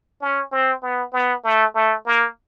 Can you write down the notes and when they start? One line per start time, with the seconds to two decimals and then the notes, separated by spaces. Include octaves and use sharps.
0.21 C#4
0.52 C4
0.82 B3
1.13 B3
1.44 A3
1.75 A3
2.06 A#3